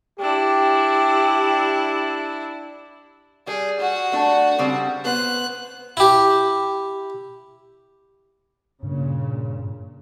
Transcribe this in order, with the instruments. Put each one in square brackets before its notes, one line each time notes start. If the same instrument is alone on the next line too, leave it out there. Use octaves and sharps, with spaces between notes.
[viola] D4 E4 [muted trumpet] G4
[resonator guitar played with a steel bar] G3 [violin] G#4
[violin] F#4 F#5
[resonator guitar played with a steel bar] A3 D4
C#3 G3 C4
[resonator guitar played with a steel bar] B3 C5 [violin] F#6
[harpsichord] E4 G4
[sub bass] G2 [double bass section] A#2 C#3